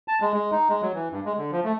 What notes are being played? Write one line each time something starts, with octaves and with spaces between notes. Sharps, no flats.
A5
G#3
G#3
D#4
G#3
F#3
E3
G2
G#3
D3
F3
A3